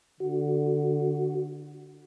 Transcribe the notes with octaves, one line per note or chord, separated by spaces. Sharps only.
D3 F#4